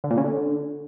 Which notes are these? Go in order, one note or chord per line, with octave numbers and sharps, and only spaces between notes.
D3
A#2
C#3
D3